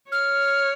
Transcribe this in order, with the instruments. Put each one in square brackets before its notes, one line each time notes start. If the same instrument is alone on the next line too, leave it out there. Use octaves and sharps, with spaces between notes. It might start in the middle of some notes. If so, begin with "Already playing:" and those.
[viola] C#5 [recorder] F6